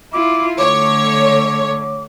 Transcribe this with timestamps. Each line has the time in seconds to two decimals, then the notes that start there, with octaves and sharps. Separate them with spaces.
0.13 E4 F4 D6
0.59 D3 A3 C#5 D6